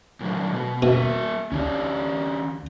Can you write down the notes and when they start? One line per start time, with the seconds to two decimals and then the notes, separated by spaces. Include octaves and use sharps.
0.20 A#2 F#3 A3
0.52 B2 B3
0.82 B2 A#3 A#4 E5
1.52 D2 C#4 G4 D5